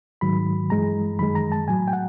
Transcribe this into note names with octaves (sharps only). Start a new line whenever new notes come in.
G#2 D#3 F#3 B5
G2 E3 G#3 A#5
F#2 D#3 G#3 B5
A#5
A5
A2 F#3 G#5
G5
F#5